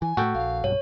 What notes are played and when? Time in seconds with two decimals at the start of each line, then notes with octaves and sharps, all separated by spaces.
0.02 E3 G#5
0.17 A2 A3 F#4 A4 G5
0.34 A#1 F5
0.64 B1 G2 C#5